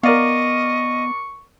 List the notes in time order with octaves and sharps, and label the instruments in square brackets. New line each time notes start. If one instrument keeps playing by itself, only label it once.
[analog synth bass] B3 [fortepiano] A#4 D5 F5 [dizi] D#5 [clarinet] C#6